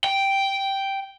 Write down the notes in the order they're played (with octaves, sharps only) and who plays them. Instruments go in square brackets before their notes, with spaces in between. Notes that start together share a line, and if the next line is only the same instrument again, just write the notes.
[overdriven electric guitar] G5